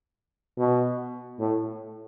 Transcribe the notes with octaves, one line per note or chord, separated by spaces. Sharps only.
B2
A2